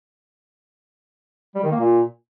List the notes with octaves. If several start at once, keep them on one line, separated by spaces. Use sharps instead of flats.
G3
D#3
A#3
A#2